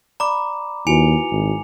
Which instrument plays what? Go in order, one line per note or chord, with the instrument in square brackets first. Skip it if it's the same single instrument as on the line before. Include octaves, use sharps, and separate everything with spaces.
[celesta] D5 B5 [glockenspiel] A#5 D6
[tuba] D#2 [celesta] E4 F#4 B4 [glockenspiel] G#5 C#7 F7
[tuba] G#1